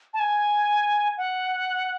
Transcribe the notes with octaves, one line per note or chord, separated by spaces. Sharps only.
A5
G#5
F#5